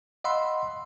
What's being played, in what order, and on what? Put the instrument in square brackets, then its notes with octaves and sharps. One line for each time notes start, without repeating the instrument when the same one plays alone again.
[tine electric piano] D#5 F5 F#5 B5 C6 E6